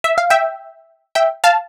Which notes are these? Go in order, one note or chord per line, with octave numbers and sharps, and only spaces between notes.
E5
F5
E5 G5
E5 G5
F5 A5